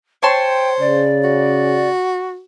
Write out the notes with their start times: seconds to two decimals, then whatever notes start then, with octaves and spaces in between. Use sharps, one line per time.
0.23 C5 C#5 G5 A5 C6
0.80 C#3 D5
1.24 F#4